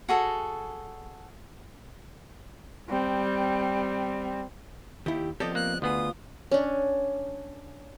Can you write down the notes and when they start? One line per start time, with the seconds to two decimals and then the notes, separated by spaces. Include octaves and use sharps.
0.09 F#4 G#4 A4
2.89 G3 C4
5.06 D#2 E4 G4
5.40 F3 B3 C4 G4 A4 D5 D#5
5.55 A#3 F#6
5.82 D2 B3 F4 G#4 D#6
6.51 C#4 D4